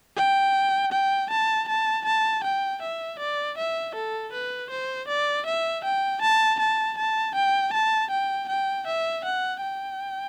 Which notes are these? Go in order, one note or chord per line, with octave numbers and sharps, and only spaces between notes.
G5
G5
A5
A5
A5
G5
E5
D5
E5
A4
B4
C5
D5
E5
G5
A5
A5
A5
G5
A5
G5
G5
E5
F#5
G5